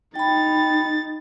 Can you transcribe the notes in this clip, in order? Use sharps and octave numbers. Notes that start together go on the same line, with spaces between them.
D#4 G5 B5 A6